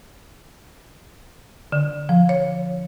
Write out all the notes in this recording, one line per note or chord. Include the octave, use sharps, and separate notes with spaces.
D3
F3
C#5